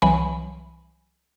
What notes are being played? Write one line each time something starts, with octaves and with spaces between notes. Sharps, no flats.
C2 E3 F#3 G#5 B5